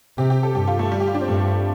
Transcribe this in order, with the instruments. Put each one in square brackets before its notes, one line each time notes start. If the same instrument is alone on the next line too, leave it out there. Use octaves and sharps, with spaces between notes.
[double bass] C3 [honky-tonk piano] G4
[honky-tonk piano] G4
A4
[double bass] G2 [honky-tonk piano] G4
[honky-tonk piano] F4
A3
G3
G4
F4
D4
C4
[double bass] G2 [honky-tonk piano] A3